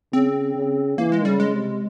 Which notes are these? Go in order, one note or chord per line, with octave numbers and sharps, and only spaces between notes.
C#3 C4
C#3
E3 A#3
G#3
C#3 G3
G#3
C3